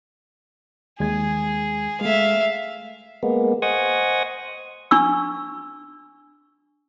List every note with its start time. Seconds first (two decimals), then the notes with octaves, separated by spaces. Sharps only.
1.00 D#2 G#3 G#4 G#6
2.01 G#3 A3 E5 F5
3.23 G#3 A#3 B3
3.62 C5 D#5 F#5 G#5 C#6 D#6
4.91 D4 C#6 E6